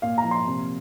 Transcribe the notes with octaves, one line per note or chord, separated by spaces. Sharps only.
A#2 F5
A#5
F3
C6
C3